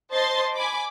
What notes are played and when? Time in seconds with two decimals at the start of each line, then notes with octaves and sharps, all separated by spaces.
0.12 C5 D#5 A5 C6 A6
0.54 G#5 B5 D6